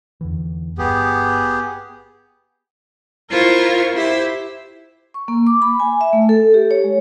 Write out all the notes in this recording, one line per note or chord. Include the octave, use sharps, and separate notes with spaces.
E2 D3 E3
G1 B3 G4 G#4
E4 F4 A#4 C5 C#6
E4 G4 C5 E5
C#6
A#3
D6
B5
G#5
E5
A3
A4
G4
C#5
G#3